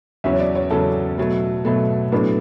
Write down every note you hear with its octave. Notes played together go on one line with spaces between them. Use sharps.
E2 C#3 F#3 C#4 E5
C#5
D5
C#5
E2 C#3 F#3 C#4 A4
B2 F#3 A3
B2 F#3 A3
A2 F#3 B3 D4